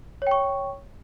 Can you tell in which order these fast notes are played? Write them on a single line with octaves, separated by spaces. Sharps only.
C#5 G5 C#6